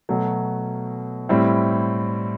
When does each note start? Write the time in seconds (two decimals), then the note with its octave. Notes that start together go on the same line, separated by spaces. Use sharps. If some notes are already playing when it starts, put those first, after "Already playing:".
0.09 B2 F#3 A3
1.29 A2 G3 C4 E4